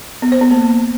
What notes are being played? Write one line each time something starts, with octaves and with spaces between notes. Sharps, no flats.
B3
C5
B3
A#3